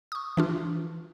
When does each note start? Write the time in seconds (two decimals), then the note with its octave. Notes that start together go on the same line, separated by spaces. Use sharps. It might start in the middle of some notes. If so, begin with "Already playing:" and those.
0.12 C#6 D#6
0.37 E3 D4 F4